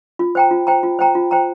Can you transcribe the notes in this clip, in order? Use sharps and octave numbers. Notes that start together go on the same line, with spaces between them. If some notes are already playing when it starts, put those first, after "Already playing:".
F4
C5 G5 A#5
F4
C5 G5 A#5
F4
C5 G5 A#5
F4
C5 G5 A#5